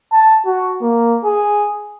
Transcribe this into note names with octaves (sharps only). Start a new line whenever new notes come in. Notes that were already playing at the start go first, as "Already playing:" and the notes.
A5
F#4
A#3
G#4